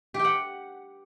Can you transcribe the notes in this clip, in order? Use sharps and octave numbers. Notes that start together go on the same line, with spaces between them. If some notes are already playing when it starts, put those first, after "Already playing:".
G4
G5
F#5